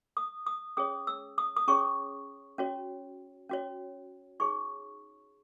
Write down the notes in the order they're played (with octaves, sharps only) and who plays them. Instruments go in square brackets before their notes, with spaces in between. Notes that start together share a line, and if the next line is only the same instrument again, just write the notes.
[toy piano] D#6
D#6
C#4 G#4 C#5 D#6
E6
D#6
D#6
C#4 G#4 C#5 C#6
C#4 F#4 C#5
C#4 F#4 C#5
D#4 G#4 C#5 C#6